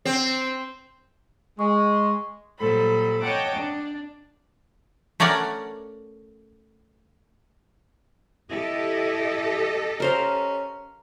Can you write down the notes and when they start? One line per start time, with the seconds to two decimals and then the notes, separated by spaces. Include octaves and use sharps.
0.05 C4
1.59 G#3 C#6
2.59 A#2 F#3 G3 A4 C5 B5
3.21 C#5 D#5 F#5 G5 A5 D6
3.57 D4
5.20 A3 C#4 A#4 D5 F#5
8.51 E4 G4 A4 D#5
10.00 C#4 A#4 C5 F5